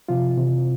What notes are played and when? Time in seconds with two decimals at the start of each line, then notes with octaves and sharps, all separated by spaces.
0.09 C3 F3 F4
0.37 C3 E3